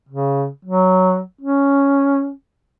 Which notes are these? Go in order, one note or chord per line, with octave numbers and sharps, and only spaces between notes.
C#3
F#3
C#4